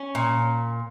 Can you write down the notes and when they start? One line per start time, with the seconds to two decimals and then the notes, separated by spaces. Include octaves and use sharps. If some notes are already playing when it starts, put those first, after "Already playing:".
Already playing: C#4
0.15 A#2